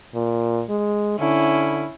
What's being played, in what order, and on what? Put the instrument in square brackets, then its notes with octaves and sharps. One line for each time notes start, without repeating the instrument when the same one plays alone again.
[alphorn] A#2
G#3
[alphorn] D3 [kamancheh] C#4 E4